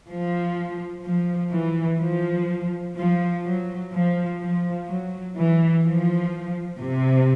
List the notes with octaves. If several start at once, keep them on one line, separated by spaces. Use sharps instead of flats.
F3
F3
E3
F3
F3
F#3
F3
F3
F#3
E3
F3
C3